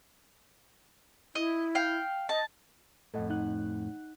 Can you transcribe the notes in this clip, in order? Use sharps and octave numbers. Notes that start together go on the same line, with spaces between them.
E4 D#5
F5 G5
D#5 A5
F2 A2 A4 D#5 F#5
D#4 F#5 F#6